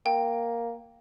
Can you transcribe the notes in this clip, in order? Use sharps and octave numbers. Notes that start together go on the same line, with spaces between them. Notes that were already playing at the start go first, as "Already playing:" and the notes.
A#3 G5